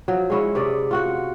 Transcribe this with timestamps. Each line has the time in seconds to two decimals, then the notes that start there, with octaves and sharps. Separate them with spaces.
0.08 F3 F#3
0.30 G#3 C#4 E4
0.55 C3 C#4 D5 D#5
0.91 F4 F#4 F#5